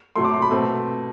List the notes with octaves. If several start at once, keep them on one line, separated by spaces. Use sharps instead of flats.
C3 F#3 A3 C6
D6
C6
B5
B2 A3 C4